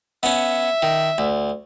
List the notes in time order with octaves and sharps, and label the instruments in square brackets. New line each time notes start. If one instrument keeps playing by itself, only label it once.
[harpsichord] B3 C#4 [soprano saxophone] E5
[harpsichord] D#3
D2